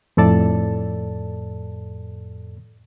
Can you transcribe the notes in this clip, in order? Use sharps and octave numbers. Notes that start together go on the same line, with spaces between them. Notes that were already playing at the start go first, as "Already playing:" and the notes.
F2 A2 A4 D5 A5